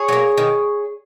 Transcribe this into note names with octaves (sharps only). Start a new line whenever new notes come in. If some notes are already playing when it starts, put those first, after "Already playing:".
Already playing: G#4 C#5
F#3 A#3
D#3